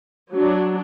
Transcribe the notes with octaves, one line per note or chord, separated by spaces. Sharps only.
F#3 D4